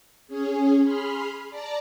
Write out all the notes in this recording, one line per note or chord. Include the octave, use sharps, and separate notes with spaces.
C#4 G#4
G#4 B5 C6 F6
D5 A5 A#5